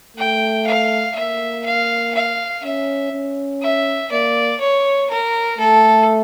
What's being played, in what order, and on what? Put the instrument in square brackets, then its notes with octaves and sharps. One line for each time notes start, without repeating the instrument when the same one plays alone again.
[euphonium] A3 [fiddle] G5
[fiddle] F5
[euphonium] A#3 [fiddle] E5
[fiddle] F5
F5
[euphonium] C#4 [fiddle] E5
[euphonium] C#4
[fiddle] E5
[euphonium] A#3 [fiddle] D5
[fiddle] C#5
A#4
[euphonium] A3 [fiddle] A4